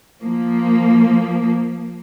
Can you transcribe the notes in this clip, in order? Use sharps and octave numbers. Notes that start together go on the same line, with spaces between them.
F3 A#3